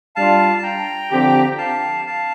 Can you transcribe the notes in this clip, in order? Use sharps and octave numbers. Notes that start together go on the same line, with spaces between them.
G3 D4 F4 F5 A5
A5
G5 A#5
D3 F3 C4 G4
F5 A5
F5 A5